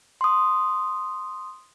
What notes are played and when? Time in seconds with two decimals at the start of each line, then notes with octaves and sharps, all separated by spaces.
0.21 C6 D#6